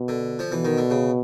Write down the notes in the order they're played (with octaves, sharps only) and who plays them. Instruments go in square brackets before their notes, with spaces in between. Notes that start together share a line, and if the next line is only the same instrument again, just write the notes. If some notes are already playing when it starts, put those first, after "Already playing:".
Already playing: [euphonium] B2
[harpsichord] D3
F3
[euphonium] B2 [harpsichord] E3
[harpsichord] D#3
D3
C#3